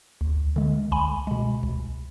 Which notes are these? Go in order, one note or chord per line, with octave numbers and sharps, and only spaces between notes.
D2
D3 G#3
C#2 G#5 B5
B2 G#3
C#2